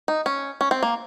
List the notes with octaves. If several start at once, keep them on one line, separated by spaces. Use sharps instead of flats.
D#4
C#4
C#4
C4
A#3